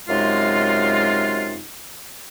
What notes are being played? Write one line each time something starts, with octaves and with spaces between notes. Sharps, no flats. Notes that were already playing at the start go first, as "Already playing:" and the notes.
F#2 C3 G#3 D#4 F4